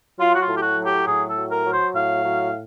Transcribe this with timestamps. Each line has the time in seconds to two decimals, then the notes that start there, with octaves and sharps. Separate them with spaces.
0.19 F#3 F4
0.34 F#4
0.42 F4
0.48 A2
0.56 G4
0.63 F#4
0.77 F#3
0.86 G4
1.07 A2 G#4
1.29 A4
1.36 F#3
1.51 A#4
1.65 F#3
1.73 C5
1.95 A2 F5
2.24 F#3